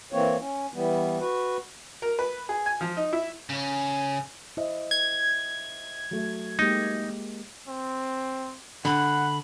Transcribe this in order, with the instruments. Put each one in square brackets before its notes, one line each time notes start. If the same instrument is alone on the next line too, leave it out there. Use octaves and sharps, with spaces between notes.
[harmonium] E3 A#3 C4 C#5
C#4
E3 G3 B3
F#4 B4
[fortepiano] A#4
B4
G#4
G#5
F3
D#4
E4
[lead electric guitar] C#3 C#4
[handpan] E4 [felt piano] C5 D#5 E5
[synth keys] G#6
[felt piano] F#3 A3
[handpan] G#3 A#3 G4 [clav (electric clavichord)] D#4
[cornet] C4
[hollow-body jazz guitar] D3 [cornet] F#5 [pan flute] B5